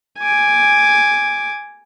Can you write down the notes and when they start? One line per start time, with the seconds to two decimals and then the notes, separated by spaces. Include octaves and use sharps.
0.19 G#5 D6